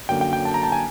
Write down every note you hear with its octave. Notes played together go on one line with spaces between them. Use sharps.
F#2 D3 F#3 A#3 G5
G5
G5
A5
A#5
A5
G#5